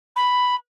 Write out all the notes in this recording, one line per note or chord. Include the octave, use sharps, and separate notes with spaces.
B5